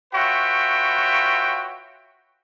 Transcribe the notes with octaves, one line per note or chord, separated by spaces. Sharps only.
F4 F#4 B4 C#5 E5 G5